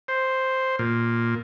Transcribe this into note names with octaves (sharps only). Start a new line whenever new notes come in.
C5
A#2